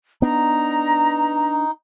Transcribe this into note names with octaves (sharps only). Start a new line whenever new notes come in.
B3 D4 D#4 A#5